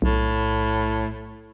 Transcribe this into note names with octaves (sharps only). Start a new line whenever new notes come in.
B1 A2